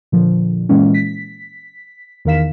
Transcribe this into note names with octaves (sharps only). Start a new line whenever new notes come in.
A#2 D3 F3
A#2 E3 G#3 A#3 C#4
B6
E2 D#3 A#4 F5 B6 E7